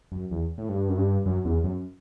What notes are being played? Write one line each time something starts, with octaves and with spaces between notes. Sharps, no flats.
F#2
E2
A2
G2
F#2
G2
F#2
E2
F#2